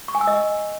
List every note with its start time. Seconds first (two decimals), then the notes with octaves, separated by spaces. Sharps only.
0.08 C#6
0.15 G#5
0.21 E6
0.27 D#5